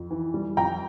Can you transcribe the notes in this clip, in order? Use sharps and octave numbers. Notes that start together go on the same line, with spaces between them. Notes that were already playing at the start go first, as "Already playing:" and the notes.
Already playing: F2
E3
G3
F2 G5 A#5